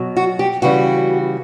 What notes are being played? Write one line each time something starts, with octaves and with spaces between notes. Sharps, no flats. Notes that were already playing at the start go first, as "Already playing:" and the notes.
Already playing: B2 F#3
F#4
G4
C#3 E3 G3 F#4